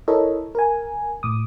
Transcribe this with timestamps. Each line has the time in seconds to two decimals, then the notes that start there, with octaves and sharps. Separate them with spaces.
0.08 E4 A4 A#4 C#5 D#5 E5
0.55 A#4 G#5
1.23 A2 D6 D#6